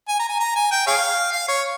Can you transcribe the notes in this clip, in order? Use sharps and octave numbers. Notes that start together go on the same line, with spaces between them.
G#5
A#5
G#5
A#5
G#5
G5
G#4 C#5 F5
F5
C#5